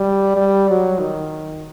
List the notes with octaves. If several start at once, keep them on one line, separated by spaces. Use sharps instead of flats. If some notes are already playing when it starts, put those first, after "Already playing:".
Already playing: G3
G3
F#3
D#3